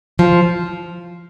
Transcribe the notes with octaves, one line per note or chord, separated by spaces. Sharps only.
F3